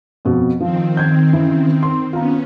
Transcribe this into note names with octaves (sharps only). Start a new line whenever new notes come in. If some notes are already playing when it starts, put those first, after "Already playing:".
F2 B2
D#3 F3 C4
G6 G#6
C#3 E3
C6
B3 C#4 F4 A#5